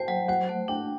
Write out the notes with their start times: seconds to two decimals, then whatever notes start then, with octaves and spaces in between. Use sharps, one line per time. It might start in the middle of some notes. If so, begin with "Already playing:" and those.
Already playing: C5 G5 A5
0.08 F#3
0.28 C5 F#5
0.49 A3
0.68 D4 G5